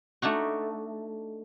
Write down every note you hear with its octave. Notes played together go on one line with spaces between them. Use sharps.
A3 D4 D#4 F#4